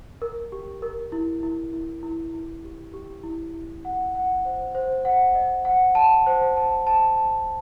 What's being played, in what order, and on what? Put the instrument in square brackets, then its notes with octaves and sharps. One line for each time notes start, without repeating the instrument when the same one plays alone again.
[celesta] A#4
G4
A#4
E4
E4
E4
E4
E4
G4
G4
E4
E4
F#5
F#5
C5
C5
F#5
D#5
F#5
A5
C5
A5
A5
A5